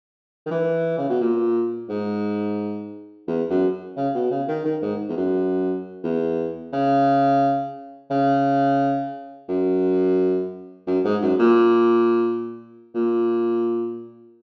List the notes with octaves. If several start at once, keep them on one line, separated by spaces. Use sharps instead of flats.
D#3
E3
C#3
B2
A#2
G#2
E2
F#2
C#3
B2
C#3
D#3
D#3
G#2
E2
F#2
E2
C#3
C#3
F#2
F#2
G#2
F#2
A#2
A#2